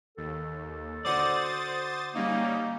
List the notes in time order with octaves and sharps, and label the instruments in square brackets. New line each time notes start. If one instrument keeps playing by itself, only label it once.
[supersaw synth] D#2 [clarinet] A4
[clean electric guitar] D3 F#4 D5 [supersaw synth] C5 D#6 A6
[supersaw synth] G3 C#4 D#4 [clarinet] A#3